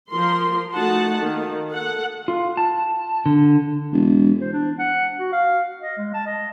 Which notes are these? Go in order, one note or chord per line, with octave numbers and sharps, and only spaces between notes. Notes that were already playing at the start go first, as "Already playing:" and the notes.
F3 A#4 C6
A3 D#4 F#4 F#5 A5
D#3 A#3
A4 F#5
F4
A5
D3
E1
C5
D4
F#5
F#4
F5
D#5
G#3
A5
D#5